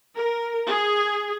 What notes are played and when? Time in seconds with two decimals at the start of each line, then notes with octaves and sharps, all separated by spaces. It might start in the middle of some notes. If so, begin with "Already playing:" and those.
0.17 A#4
0.70 G#4